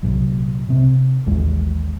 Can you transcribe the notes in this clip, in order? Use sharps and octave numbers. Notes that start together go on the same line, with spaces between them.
C2 A#2 F#3
C3 C4
A1 D#2 G#3